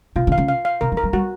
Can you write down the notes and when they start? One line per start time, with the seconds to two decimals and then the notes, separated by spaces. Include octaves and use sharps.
0.16 C3 F4
0.27 C#3
0.32 F5
0.38 C#3
0.48 F5
0.65 F5
0.81 C3 A#4
0.92 F3
0.97 A#4
1.03 F#3
1.13 G3 F#4